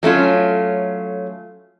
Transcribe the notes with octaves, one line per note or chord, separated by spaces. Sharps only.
F#3 A3 C#4 F4